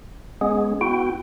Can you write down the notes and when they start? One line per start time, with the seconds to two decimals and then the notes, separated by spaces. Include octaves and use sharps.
0.41 G#3 B3 C#4 G#4
0.81 B3 E4 F#4 G5